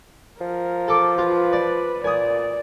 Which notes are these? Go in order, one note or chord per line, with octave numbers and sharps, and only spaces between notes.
F3 A#4
A4 D6
F4 B4
D5
A#2 D5 G#5 D#6